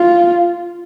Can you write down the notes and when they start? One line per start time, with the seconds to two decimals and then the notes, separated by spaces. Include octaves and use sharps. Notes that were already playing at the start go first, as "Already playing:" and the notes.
Already playing: F4